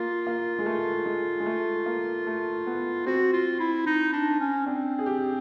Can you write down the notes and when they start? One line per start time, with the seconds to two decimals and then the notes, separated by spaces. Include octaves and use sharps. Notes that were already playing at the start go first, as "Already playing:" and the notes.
Already playing: A#3 F4
0.27 A#3
0.59 G#3
0.66 A3
1.06 G#3
1.40 G#3
1.46 A3
1.86 A#3
2.27 A3
2.67 B3
3.06 C4 F#4
3.33 F4
3.59 E4
3.86 D#4
4.13 D4
4.40 C#4
4.66 C4 D4
4.99 G#4
5.06 G4